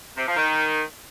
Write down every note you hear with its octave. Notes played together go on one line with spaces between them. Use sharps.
C3
F3
D#3